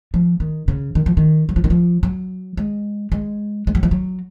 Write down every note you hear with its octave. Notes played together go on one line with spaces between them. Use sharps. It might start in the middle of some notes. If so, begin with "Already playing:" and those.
F3
D#3
C#3
D#3
F3
D#3
F#3
F3
D#3
F3
F#3
G#3
G#3
G#3
F#3
F3
F#3